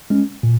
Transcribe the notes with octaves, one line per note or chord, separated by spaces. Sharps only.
G#3 C#4
A#2